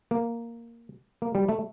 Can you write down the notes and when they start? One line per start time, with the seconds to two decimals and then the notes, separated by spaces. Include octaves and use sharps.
0.11 A#3
1.22 A#3
1.35 G3
1.49 A3